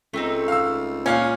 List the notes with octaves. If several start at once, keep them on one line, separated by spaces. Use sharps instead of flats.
C#2 A3 C4 D#4
F5 E6
A#2 C#4 F5 F6